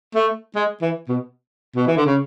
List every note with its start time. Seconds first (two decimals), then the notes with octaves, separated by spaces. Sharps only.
0.15 A3
0.56 G#3
0.82 E3
1.08 B2
1.76 B2
1.87 E3
1.97 D3
2.06 C#3